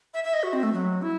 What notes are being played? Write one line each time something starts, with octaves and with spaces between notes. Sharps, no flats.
E5
E5
D#5
F#4
C4
A3
F#3
E4